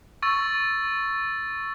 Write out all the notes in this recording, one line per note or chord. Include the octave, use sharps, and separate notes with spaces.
C#6 E6 A6